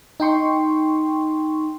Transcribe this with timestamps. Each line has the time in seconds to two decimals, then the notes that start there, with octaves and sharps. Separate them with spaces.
0.20 D#4 G5 C6 C#6